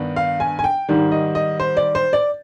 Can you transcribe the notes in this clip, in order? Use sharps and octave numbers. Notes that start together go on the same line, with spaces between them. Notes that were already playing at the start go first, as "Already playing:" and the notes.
Already playing: G2 D#3 B3 D4
F5
G#5
G#5
G5
G#2 D#3 G3
D#5
D#5
C5
D5
C5
D5